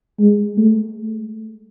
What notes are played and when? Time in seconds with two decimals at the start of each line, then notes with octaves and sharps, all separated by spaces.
0.20 G#3
0.57 A3